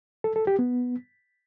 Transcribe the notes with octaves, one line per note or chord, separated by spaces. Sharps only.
A4
A4
G4
B3